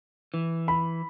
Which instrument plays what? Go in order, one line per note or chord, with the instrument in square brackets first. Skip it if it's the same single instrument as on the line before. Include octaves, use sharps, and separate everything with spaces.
[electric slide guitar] E3
[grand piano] B5